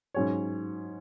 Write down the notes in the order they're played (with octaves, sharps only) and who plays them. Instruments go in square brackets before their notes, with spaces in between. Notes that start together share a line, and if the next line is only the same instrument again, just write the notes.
[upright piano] G#2 F#3 C#4 G#4 C#5